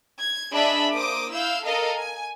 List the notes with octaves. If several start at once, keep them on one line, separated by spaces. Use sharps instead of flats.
G#6
D4 G#4 D#5 E5 B5
A#3 C5 D6 D#6
E4 F5 E6 G6
A4 A#4 D#5 F5 A#5 D#6
G#5